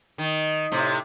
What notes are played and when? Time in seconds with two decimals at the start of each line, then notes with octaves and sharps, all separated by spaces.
0.18 D#3
0.72 A2 C3